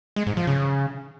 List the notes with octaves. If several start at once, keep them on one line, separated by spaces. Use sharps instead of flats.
G#3
G#2
F3
C#3